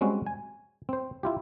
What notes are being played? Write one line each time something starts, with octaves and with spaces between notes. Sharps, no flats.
G3 G#3 C4 C#4 F#4
G#5
C4 C5
E4 F4 G4